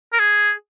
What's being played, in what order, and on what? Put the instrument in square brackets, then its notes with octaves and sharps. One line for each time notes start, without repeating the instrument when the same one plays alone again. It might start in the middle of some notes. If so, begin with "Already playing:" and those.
[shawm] A#4
G#4